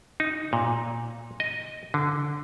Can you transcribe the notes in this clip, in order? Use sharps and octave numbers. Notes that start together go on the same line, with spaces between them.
D#4
A#2
D#5
D3